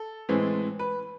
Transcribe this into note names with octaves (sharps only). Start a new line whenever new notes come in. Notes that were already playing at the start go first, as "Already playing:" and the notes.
Already playing: A4
A2 E3 G#3 C4
B4